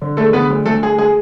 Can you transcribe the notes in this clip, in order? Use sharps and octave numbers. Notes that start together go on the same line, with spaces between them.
D3
G#3 A3 A4
D3 B3 B4
D2
D2 A3 A4
G#3 G#4
G#3 G#4